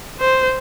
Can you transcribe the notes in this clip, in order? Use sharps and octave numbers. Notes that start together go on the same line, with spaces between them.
C5